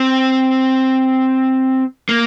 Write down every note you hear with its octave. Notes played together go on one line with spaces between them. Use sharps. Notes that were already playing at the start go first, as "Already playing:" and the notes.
Already playing: C4
A#3